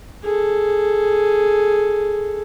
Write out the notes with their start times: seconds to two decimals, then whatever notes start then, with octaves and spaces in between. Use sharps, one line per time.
0.23 G#4 A4